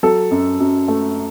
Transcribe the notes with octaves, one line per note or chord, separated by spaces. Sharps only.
F#3 A4
F#2
F#2
A3